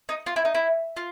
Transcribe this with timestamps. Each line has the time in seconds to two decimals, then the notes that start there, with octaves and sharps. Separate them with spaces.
0.09 D#4
0.26 F4
0.36 E4
0.45 D#4
0.55 E4
0.97 F4